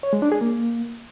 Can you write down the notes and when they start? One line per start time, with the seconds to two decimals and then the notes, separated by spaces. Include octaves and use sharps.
0.03 C#5
0.13 G#3
0.22 D4
0.32 G#4
0.41 A#3